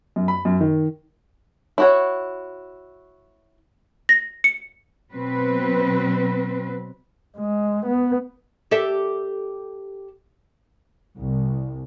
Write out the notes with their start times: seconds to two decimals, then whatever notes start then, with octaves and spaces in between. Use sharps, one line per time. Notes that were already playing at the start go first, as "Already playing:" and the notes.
0.16 F#2
0.28 B5
0.45 F#2
0.61 D#3
1.78 E4 F#4 C#5
4.09 A#6
4.44 C#7
5.13 B2 F#3 C4 B4
7.38 G#3
7.87 B3
8.71 G4 A4 E5
11.16 C2